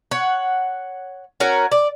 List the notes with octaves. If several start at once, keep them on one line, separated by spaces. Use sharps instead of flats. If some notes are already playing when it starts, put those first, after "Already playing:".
C#5 F#5
C#4 F#4 A#4
D5